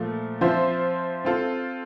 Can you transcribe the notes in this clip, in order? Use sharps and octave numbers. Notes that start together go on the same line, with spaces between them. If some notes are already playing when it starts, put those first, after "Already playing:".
Already playing: A#2 F3 A3
F3 C4 F4 C5 E5
C4 F4 A4